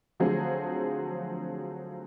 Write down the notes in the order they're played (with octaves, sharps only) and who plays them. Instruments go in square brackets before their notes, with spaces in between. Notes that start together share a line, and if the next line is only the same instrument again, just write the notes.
[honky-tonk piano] D3 F3 F#3 A3 C4 G#4